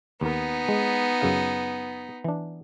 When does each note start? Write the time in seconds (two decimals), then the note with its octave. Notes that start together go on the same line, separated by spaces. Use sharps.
0.21 D#2 B3 D#4 A#4
0.68 G#3
1.21 F#2 C#3 F5
2.24 E3 D4